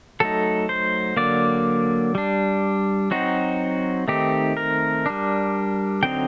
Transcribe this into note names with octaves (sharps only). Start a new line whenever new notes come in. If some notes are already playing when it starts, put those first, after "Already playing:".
F#3 A3 D#4 A4
C5
D3 F#3 A#3 D5
G3 D4
F#3 C4 D#4 F#4
D#3 A3 C4 D#4 G4
A#4
G3 D4
D3 F#3 C4 D#4 G5